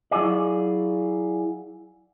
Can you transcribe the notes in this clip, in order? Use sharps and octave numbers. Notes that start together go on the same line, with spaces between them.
F#3 E4 F4 G#4 D5